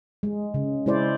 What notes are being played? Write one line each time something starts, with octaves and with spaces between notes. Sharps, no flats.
G#3
C#3
G#3 E4 C5 D5